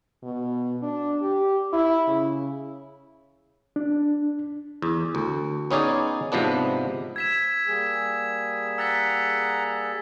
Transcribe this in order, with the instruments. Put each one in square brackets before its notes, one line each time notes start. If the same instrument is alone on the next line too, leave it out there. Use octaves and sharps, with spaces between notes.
[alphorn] B2
D4
G4
E4
C#3
[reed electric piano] D4
[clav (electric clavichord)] E2
D2
B3 C#4 D#4 G#4 D5 G#5
G#2 C3 F3 B3 D4
[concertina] E6 [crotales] G#6 B6 E7
[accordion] G3 A#3 G#4
[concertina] F#5 A#5 [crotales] E6 A6 B6